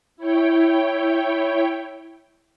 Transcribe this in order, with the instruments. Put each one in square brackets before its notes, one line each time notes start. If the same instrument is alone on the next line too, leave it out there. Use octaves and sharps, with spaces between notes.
[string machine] E4 C#5 G5